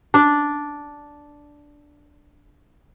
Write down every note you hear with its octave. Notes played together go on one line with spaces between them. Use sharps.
D4 D5